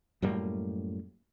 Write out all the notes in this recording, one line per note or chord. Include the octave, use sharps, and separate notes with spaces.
F#2 A2 G3 A#3